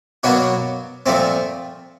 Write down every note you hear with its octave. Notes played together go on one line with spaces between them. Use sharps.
B2 F#3 A#3 D4 F#4
A#2 F3 A3 C4